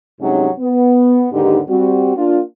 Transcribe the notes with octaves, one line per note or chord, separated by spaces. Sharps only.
G2 C3 F#3 G#3 C#4 D#4
B3
D#2 G#2 D3 D#4 G4 B4
G3 C4 F#4
A#3 D4 F4